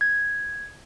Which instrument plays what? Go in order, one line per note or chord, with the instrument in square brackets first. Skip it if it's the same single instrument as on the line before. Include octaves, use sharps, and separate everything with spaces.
[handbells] G#6